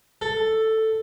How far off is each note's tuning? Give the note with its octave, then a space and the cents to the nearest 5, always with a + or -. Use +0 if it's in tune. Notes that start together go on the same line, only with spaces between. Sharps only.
A4 +5